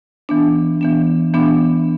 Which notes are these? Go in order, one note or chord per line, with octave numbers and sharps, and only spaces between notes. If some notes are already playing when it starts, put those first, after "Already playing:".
E3 B3 D4
E3 B3 D4
E3 B3 D4